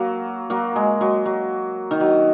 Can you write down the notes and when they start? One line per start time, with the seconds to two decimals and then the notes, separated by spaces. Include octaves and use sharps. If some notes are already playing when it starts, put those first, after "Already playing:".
Already playing: F#3 A#3
0.50 F#3 A#3
0.76 G#3
1.01 F#3
1.26 F#3
1.91 D#3
2.01 F#3